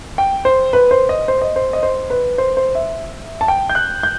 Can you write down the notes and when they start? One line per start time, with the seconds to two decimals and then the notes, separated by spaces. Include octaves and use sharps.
0.18 G5
0.45 C5
0.73 B4
0.91 C5
1.09 D#5
1.28 C5
1.41 D#5
1.56 C5
1.73 D#5
1.83 C5
2.10 B4
2.38 C5
2.57 C5
2.75 E5
3.41 A5
3.48 G5
3.70 G6
3.75 F#6
4.03 G6